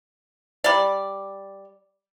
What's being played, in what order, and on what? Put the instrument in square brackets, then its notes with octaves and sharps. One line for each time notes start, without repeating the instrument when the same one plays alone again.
[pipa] G3 D5